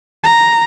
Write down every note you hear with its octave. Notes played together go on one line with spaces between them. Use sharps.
A#5